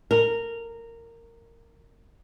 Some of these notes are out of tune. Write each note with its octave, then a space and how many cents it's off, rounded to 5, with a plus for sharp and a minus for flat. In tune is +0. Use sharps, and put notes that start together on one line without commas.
A#4 -15